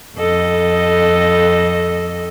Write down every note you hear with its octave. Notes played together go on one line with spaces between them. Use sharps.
F2 A4 D#5